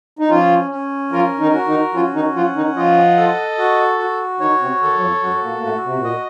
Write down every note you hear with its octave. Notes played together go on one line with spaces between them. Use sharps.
D#4
F3 C#4 F4
C#4
F3 F4 A#4
D#3 D#4
F#4
D#3 D#4
F3 C#4 F4
D#3 D#4
F3 F4 F#5
D#3 D#4
F3 F4 D#5
A4
F#4
F#4
D#3 D#4 C#5
C3 C4
D#2 D#3 A4
F#3
F2 F3
F#2 F#3 F#4
A#2 A#3
A#3
A2 A3 F#4
C3
A#2
D#5